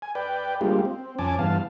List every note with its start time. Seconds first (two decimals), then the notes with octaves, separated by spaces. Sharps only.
0.02 G#5
0.15 B4 D5 G5
0.61 G3 G#3 A#3 D4 F4 G4
0.85 C4
1.19 F2 C#4 G#5 A5 D6
1.39 G2 E3 B3 F5 A5